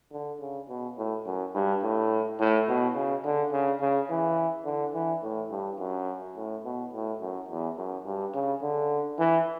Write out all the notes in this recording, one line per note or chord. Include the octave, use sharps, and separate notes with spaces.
D3
C#3
B2
A2
F#2
G2
A2
A2
B2
C#3
D3
C#3
C#3
E3
D3
E3
A2
G2
F#2
A2
B2
A2
F#2
E2
F#2
G2
C#3
D3
E3